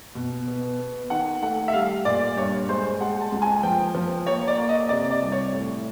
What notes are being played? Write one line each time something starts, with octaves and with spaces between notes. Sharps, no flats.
B2
B3
B3
D#3 F#5
A3 F#5
E5
G3 F5
A#2 D5
G2 C#5
G#3 C5
G#3 F#5
A5
C#2
G#5
F3 G5
F3
A#3 C#5
D5
A#3
D#5
C3 D5
D5
C2
C#5
A2